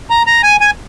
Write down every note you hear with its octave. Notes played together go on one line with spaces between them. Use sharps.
A#5
A#5
G#5
G#5